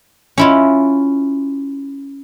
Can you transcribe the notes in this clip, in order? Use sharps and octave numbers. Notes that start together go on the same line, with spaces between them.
C#4 E4 F4